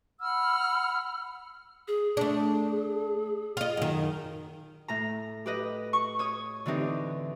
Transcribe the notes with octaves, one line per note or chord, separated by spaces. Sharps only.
F#5 B5 E6 F6
G#4
A3 D4 G#4
F4 D#5
F#2 D#3
A2 A#5
G4 B4 D#5
C#6
C#5 D#6
D3 E3 C4 D#4 G4